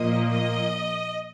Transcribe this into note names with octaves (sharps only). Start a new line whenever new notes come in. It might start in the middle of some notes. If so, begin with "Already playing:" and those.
Already playing: A#2 F3 A#3 D#5
D#5